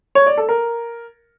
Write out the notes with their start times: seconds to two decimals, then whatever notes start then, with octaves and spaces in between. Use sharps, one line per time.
0.15 C#5
0.26 D5
0.38 A4
0.49 A#4